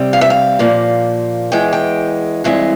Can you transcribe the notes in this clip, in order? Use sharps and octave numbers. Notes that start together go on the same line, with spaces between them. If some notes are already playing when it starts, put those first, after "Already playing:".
Already playing: C3 G3 C4
F5
E5
F5
A#2 F3 A#3
E2 E3 G#3 G5
G5
G2 E3 G#3 C4